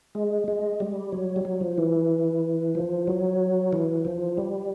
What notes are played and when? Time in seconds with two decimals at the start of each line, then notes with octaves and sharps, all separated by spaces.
0.15 G#3
0.48 G#3
0.80 G3
1.12 F#3
1.36 G3
1.45 F#3
1.61 F3
1.78 E3
2.75 F3
3.07 F#3
3.73 E3
4.05 F3
4.38 G3